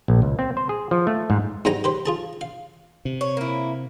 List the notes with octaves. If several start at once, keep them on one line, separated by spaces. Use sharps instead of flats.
A#1
C#2
C4
C5
G#4
F3
A3
G#2
G#2 G3 G#3 F#5 G#5 A#5
G4 B4 C5
F4 G#4 A5
F5
C3
C#5
A#3 E4